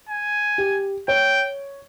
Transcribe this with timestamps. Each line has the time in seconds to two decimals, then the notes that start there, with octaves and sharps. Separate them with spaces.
0.09 G#5
0.58 G4
1.08 C#5 G5